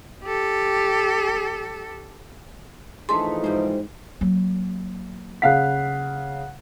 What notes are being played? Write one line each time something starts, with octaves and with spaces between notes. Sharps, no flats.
G4 A4
E3 F3 A3 D4 D#4 G#4 C6
G#2 G3 C4
F#3 A#3
C#3 F5 F#5 F#6 B6